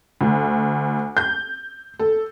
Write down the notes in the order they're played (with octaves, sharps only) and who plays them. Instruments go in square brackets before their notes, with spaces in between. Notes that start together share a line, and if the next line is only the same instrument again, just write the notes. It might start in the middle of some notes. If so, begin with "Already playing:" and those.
[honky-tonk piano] D2
G6
A4